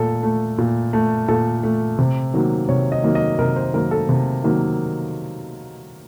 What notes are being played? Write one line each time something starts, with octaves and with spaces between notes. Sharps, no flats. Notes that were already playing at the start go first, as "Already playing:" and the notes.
Already playing: A#2 A3 A4
A3
A#2
A3
A#2 A4
A3
C3
D#3 F#3 A#3
C3 C#5
D#5
D#3 F#3 A#3
D#5
C3 A#4
C5
D#3 F#3 A#3 A#4
A4
C3
D#3 F#3 A#3